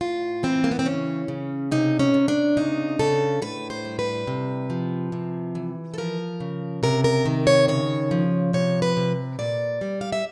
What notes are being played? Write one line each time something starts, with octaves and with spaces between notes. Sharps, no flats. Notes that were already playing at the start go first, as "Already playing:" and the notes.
A2 F4
E3 C4
A#3
B3
C4
C#3 C#4
C#3
C3 D#4
C#4
C3
D4
C#3 D#4
C#3 A4
A2 B4
C5
G3
B4
C3
F3
C3
E3
A4
F3 A#4
C#3
C3 A#4
A#4
D#3
C#5
C#3 C#5
F3
C3 C#5
B4
C3
A#2 D5
G3
F5
E5